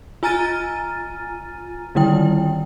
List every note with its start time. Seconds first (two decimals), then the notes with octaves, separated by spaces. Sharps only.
0.23 F4 G#5 A#5 F6 A6 D#7
1.95 D3 D#3 G3 E4 G5